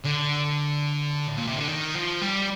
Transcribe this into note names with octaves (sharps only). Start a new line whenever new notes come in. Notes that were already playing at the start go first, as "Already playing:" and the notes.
D3
A2
A#2
C3
D3
D#3
F3
G3